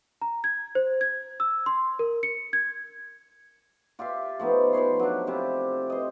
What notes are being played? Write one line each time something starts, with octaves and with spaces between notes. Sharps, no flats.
A#5
G#6
C5
G#6
E6
C6
A#4
C#7
G#6
F4 G4 E5 F5
F3 A3 B3 D#4
F3 B4 C#5 C6
F#3 D4
C3 E4 F4 G4
C5 D#5